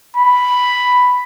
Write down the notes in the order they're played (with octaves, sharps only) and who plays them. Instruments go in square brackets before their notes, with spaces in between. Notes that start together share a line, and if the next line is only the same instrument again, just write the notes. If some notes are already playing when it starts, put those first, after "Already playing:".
[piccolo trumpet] B5